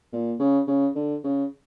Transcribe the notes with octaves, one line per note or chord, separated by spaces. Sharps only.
A#2
C#3
C#3
D3
C#3